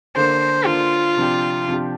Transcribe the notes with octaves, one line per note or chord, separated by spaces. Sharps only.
D3 A#3 D4 C5
D3 A#3 D4 F4
C3 F3 D4 G4
C3 F3 D4 G4